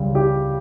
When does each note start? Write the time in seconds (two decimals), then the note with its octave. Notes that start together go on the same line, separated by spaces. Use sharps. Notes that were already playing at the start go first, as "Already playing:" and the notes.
Already playing: C#2 C#3 G3
0.15 G4